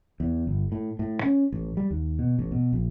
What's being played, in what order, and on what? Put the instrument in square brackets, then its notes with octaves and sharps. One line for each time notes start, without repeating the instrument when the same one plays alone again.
[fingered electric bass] E2
G1
A2
A2
C#4
A1
G3
D#2
B2
A1
B2
A#1